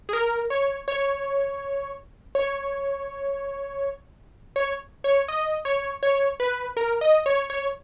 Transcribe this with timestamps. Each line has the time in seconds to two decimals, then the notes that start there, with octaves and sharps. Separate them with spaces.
0.09 G#4
0.13 A#4
0.50 C#5
0.88 C#5
2.35 C#5
4.56 C#5
5.04 C#5
5.28 D#5
5.65 C#5
6.03 C#5
6.40 B4
6.77 A#4
7.01 D#5
7.26 C#5
7.50 C#5